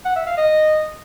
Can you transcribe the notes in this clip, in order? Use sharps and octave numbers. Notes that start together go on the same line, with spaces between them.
F#5
E5
F5
D#5